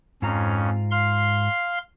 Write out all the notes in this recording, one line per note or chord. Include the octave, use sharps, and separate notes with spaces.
F2 G#2 C#4 F4 A#5
F5 C6 F6